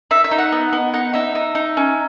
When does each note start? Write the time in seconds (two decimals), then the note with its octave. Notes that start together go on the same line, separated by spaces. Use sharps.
0.11 D#4 E5
0.24 E5
0.31 D#4
0.38 F#5
0.52 B3
0.73 B3
0.94 D#4 F#5
1.14 D#4 E5
1.35 D#4
1.55 D#4
1.77 C#4